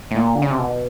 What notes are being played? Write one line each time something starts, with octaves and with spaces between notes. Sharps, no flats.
A2
A#2
D3
C#3
C3
B2